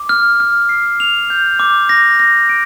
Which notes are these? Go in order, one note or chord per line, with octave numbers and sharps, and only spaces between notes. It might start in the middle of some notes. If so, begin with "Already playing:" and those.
Already playing: D6
F6
F6
C7
F7
G6
D6
A#6
A#6
D7